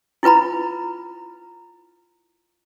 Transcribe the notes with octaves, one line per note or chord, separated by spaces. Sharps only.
E4 F4 B4 A#5 B5